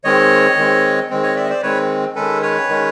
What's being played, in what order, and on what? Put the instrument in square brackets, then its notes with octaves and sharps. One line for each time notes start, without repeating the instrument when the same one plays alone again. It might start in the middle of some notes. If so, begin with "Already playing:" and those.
[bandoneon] D#3 G#3 C4 C#5 D#5
D#3 G#3 C4
D#3 G#3 C4
C#5 D#5
D5 E5
D#5
C5 D5
D#3 G#3 C4 B4 C#5
D#3 G#3 C#4 A4 B4
B4 C#5
D#3 G#3 C#4